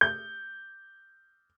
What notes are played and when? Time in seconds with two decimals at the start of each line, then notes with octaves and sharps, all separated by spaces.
0.01 G6